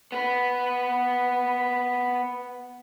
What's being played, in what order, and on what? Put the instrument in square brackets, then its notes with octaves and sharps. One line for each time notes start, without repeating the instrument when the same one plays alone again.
[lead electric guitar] B3 B4